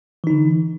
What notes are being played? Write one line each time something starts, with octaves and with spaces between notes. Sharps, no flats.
D3 E3 D#4